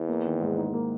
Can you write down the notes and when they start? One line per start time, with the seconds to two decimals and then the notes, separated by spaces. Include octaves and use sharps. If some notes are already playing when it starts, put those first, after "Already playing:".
Already playing: E2 E4
0.09 A#3
0.25 D#3
0.41 G#2
0.57 D#4
0.74 A#3